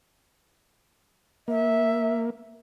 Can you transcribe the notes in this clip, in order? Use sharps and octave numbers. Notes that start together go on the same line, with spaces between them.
A#3 E5